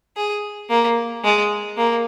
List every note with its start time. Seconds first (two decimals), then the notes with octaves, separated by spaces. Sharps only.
0.16 G#4
0.70 A#3
1.24 G#3
1.77 A#3